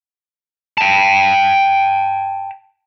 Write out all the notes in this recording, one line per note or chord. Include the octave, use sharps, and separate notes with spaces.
G5 A5